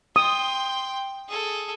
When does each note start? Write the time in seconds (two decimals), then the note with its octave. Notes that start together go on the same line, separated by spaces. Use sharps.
0.16 G5 C6 D#6
1.29 G#4 A4